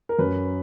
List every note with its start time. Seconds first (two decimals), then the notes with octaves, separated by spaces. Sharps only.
0.09 A#4
0.19 F#2 B4